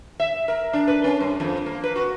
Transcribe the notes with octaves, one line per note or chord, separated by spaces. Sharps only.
E5
A#4
D4
B4
C#4
G2
F2
A#3
B4
F#4